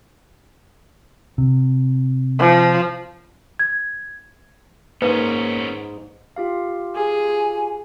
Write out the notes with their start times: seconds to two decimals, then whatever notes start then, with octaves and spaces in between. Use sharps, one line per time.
1.38 C3
2.39 F3
3.59 G#6
5.02 G#2 A#3 B3 C#4 D#4 B4
6.36 F4 G4 F5
6.95 G#4 G#5